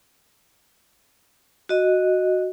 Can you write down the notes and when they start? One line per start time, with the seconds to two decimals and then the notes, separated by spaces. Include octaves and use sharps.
1.69 F#4 D#5